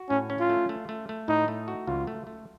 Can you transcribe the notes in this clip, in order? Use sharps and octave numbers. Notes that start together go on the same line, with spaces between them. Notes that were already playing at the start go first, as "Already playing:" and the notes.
Already playing: F#4
A2 C#4
C#4
F4
A3
A3
A3
A3
A2 D#4
A3
F#4
C#2 F4
A3
A3